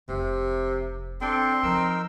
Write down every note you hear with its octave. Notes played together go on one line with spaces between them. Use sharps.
F1 C3
C4 D4 A4 G5
F3 D#4 A#4 E6